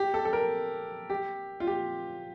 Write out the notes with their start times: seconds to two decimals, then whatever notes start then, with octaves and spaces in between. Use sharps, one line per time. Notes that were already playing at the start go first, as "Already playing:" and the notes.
Already playing: G4
0.14 A4
0.25 A4
0.33 A#4
1.10 G4
1.60 F4
1.67 G4